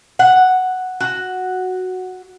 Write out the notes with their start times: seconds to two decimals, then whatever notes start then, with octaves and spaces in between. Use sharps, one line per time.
0.19 F#5
1.00 F#4